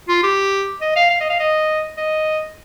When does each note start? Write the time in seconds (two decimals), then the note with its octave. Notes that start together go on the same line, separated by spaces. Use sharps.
0.09 F4
0.23 G4
0.81 D#5
0.96 F5
1.10 F5
1.21 D#5
1.30 F5
1.40 D#5
1.97 D#5